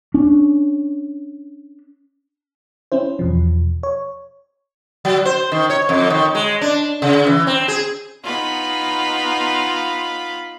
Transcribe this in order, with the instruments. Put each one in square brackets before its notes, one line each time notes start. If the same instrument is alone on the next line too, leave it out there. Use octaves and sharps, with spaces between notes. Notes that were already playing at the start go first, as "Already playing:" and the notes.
[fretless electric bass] C#4 D4
[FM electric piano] C4 C#4 E4 C5
E2 B2 F3
C#5
[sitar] F#3
C5
D#3
C#5
F2
D#3
G#3
D4
C#3
E3
C4
G#4
[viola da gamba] B3 D#4 [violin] F4 B5